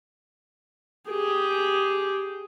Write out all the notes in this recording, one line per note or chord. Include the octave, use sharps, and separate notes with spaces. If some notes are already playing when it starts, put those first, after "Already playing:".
G4 G#4